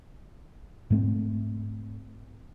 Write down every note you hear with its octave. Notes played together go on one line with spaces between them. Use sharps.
G#2 A3 C4